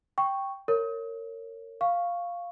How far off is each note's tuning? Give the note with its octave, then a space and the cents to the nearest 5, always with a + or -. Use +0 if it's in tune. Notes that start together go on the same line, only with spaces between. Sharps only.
G5 +0 C#6 +0
A#4 -30 C#5 -5
F5 +0 C#6 +0